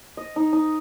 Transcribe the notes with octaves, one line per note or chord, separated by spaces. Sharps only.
D#5
D#4
D#4